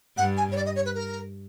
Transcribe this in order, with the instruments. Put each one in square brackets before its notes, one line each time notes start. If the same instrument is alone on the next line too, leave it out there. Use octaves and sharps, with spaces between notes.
[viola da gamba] G2 [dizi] F#5
[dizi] G#5
C#5
D5
D#5
C#5
B4
A#4